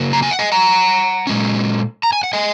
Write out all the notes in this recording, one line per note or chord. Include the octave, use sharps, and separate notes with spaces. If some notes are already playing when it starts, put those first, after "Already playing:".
Already playing: C#3 F#3 A#3
A#5
G#5
F#5
D#5 G#5
F#5 A#5
A#2 G#3 C#4
A#5
G#5
F#5
D#5 G#5